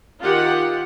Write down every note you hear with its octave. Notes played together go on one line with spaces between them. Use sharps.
D#3 F4 G4 F#5